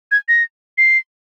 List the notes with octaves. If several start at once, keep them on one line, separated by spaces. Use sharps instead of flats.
G#6
A#6
C7